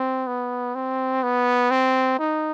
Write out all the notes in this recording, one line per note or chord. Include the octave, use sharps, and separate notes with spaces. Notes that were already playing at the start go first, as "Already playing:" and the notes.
Already playing: C4
B3
C4
B3
C4
D#4